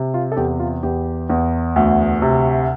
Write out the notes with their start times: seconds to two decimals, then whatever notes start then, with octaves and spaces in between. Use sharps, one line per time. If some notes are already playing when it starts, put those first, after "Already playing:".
Already playing: C3
0.14 F4
0.32 A4
0.37 E2 G4
0.59 F4
0.83 E2 G4
1.30 E2
1.76 D2
2.22 C3